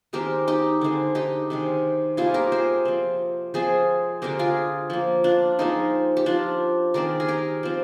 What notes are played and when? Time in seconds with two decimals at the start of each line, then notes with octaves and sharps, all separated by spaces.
0.13 D#3 G#3 C4 G4 A#4
0.48 D#4 G4
0.81 D3 G#3 C4
1.15 D#4 G4
1.50 C3 D#3 G#3
2.17 C3 G3 A#3 F4 G#4
2.34 G4 A#4
2.52 G#4 C5
2.85 F3 C4
3.54 F3 G#3 C4 G#4 C5
4.22 D3 G#3 C4 G4 A#4
4.39 F4 G#4
4.90 F3 A#3
5.24 D4 F4
5.59 F3 G#3 C4 D#4
6.17 G4
6.26 F3 C4 D4 F4
6.94 D#3 G#3 C4 A#4 D5
7.20 G#4
7.28 G4 A#4
7.63 F3 C4